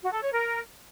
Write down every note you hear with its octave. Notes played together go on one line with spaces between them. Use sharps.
F#4
A4
C#5
A#4